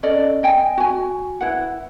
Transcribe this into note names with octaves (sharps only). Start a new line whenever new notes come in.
C#4 A4 D5 D#5
D#5 G5 G#5
F#4 G#5
E4 B4 F#5